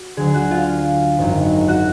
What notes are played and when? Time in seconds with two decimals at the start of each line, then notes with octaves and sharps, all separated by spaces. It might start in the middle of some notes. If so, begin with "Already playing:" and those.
Already playing: F#4
0.17 D2 D3 F#3 G#4 G#5
0.34 F#4 F#5
0.51 F4 F5
1.18 G#1 F#2 D#3 F#3
1.68 F#4 F#5